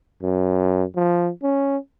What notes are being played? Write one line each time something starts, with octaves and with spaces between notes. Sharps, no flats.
F#2
F3
C#4